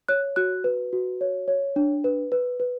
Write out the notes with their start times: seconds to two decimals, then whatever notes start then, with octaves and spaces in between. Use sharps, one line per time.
0.09 C#5 F#6
0.36 F#4 F#6
0.64 B4
0.93 F#4
1.21 C#5
1.48 C#5
1.76 D4
2.04 B4
2.32 B4
2.60 B4